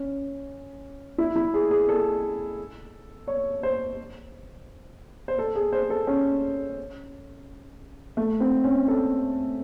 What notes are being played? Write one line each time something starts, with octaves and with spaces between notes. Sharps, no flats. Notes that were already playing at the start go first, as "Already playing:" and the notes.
Already playing: C#4
E4
E4
G#4
G#4
A4
C#5
C5
C5
A4
G#4
C5
A4
C#4
A3
C4
C#4
A4